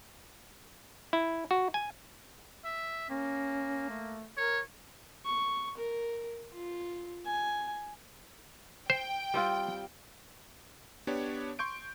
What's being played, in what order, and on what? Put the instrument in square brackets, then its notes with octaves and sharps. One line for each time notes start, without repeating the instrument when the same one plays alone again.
[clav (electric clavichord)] E4
F#4
G#5
[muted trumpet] E5
[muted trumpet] A#3 [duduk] C#4
[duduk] A3
[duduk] A#4 [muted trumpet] C#5
[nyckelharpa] C#6
A#4
F4
G#5
[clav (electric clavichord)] C5 [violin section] G5
[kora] G3 C4 F4
[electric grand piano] B3 D4 G4 C#5
C6 C#6 G6 D7